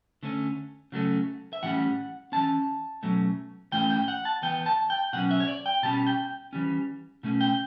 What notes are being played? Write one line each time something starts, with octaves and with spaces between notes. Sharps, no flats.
D3 A3 C#4
C#3 F#3 A3 C#4
E5
A2 E3 G3 C#4 F#5
E3 A3 C#4 A5
B2 F#3 A3 C#4
A2 E3 A3 C#4 G5
G5
F#5
A5
E3 B3 G5
A5
G5
B2 F#3 C#4 F#5
E5
C#5
D5
G5
B2 G3 C#4 A5
G5
E3 G3 C#4
B2 A3 C#4
G5